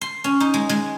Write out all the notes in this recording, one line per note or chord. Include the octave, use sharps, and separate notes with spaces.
C6
C#4
D#4
G#3
G#3